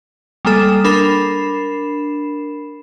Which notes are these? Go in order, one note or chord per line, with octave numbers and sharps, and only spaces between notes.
G3 G#3 A#3 A4 D#6
D4 A#4 B5 C7 E7